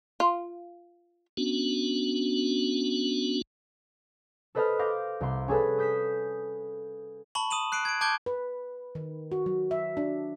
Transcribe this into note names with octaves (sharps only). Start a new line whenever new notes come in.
F4
B3 C#4 D4 F#4
A4 B4 C5 D#5 A5 F6
F5 C6 D6 G6 A#6
C2 C6
C#4 G#4 A4 B4
D#6 G6 B6 D#7 E7
A5 B5 C#6 F#7
D#6 D#7 E7 F#7
F#6 C7 D7 D#7
G#6 D7
A5 D6 G6 G#6 D7 G7
B4
D#3
F#4
F#3
E5
D4